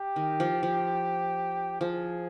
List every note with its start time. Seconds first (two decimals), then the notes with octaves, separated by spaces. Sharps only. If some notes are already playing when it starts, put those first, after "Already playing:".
Already playing: G4
0.16 D#3
0.40 F3
0.63 F3
1.81 F3 G#4